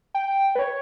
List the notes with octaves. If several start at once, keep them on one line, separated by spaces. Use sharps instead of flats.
G5
B4
C#5